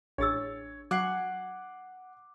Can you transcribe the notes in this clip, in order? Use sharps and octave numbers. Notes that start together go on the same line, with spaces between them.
A1 D4 G#4 C#5 E6 A6
F#3 F#5 G#5 D6 F#6 C7